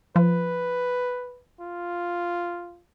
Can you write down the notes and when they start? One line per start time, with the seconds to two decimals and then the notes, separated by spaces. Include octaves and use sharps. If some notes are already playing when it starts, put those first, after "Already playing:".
0.16 F3 B4
1.60 F4